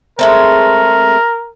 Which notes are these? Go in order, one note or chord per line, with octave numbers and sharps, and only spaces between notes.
G#3 A3 C4 A#4